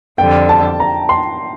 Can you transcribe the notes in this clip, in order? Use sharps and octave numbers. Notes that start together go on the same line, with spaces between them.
F2 D3 G3 G5
A5
A#5
C6